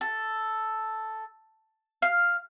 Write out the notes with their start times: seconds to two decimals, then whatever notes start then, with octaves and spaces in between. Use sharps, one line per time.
0.01 A4
2.02 F5